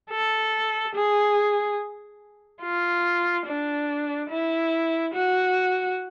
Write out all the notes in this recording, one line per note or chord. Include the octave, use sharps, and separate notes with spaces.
A4
G#4
F4
D4
E4
F#4